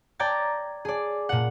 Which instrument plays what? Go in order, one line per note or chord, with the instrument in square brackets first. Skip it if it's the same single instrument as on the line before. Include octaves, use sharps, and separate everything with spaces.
[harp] D5 G5 A#5 G#6 A6
G#4 D5
A#2 F#5